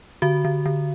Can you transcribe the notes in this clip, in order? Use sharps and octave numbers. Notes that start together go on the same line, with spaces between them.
D3 F#4
D3
D3